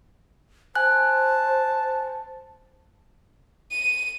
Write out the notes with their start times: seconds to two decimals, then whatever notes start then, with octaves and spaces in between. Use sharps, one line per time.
0.75 C5 G#5 A5 F#6
3.71 D#7